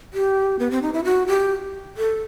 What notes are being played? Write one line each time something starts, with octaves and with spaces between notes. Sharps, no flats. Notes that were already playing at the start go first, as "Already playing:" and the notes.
G4
B3
C4
D#4
E4
F#4
G4
A4